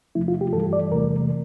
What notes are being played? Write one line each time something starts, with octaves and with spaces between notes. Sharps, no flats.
E2 C3 F3 A3 E4
F4
G4
G2 E3 G3 A4
D5
E2 C3 E3 A3 A#4